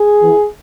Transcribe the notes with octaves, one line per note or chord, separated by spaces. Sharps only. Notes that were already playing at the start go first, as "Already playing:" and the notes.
Already playing: G#4
E3 B3 E4